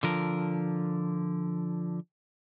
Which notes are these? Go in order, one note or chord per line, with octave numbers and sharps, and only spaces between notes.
D3 F3 A#4